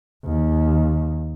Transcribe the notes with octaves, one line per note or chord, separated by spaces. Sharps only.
D#2